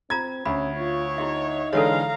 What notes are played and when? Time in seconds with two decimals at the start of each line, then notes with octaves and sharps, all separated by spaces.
0.10 C4 F4 A#5 G#6
0.45 D2 C#4 B5
0.77 F4 C#5
1.18 D#4 E4 G4 E5
1.73 D3 E3 G#3 A4 C#5 F5 A#5